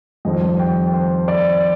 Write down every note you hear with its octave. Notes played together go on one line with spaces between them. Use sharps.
F2 D#3 G3 C4 D#5
G5
C5
D5